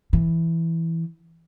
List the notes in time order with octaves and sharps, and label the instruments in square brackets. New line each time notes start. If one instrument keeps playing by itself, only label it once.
[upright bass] E3